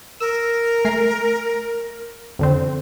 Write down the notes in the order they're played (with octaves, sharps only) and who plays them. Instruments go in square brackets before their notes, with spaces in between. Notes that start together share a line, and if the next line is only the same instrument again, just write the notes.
[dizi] A#4 [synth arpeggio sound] E6
[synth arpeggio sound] A3 G#5 C7
F2 D3 C4